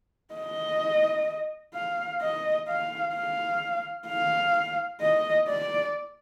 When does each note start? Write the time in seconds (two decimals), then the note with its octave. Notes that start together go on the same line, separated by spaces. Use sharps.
0.34 D#5
1.74 F5
2.21 D#5
2.68 F5
3.14 F5
4.08 F5
5.01 D#5
5.48 D5